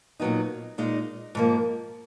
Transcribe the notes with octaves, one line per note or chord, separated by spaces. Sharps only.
A#2 F#3 B3 D#4
A#2 G#3 D#4
G#2 F3 A#3